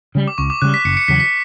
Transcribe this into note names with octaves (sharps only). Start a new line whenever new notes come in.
C#3 G3
D6
C#2 C#6
D6
C#3 G3 F#6
B6
F#1 C#7
C#7
E2 C#3 F#3 B6
B6